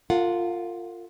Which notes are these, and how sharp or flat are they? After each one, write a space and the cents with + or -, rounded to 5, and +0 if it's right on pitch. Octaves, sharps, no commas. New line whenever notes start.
F4 +0 A#4 -45 F#5 -20